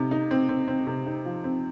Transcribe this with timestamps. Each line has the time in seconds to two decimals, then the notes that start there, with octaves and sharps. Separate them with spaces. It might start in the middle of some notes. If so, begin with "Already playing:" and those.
Already playing: C3 D#4
0.11 D#4
0.31 C4
0.49 C4
0.68 C4
0.87 C3
1.06 D#4
1.25 F3
1.44 C4